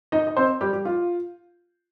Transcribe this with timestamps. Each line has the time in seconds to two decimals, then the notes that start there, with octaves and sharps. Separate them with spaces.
0.12 D#4 D#5
0.27 D#5
0.37 C4 C5
0.61 G3 G4
0.73 G4
0.85 F4